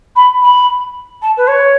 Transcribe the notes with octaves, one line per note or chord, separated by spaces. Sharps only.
B5
B5
A5
B4
C#5